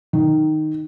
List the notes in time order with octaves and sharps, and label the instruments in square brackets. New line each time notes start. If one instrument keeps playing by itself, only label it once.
[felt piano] D#3